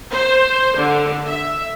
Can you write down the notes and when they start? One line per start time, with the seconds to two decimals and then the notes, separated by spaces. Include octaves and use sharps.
0.12 C5
0.76 D3
1.27 E5